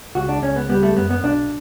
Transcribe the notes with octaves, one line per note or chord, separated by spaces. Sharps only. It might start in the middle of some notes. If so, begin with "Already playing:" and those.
C#2 F#4
D4
C#2 C#4
B3
G3 B3
A3
F#2 B3
B3
B1 D4